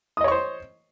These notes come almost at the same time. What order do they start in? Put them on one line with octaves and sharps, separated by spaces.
D#6 D#5 C#5 C#6 C5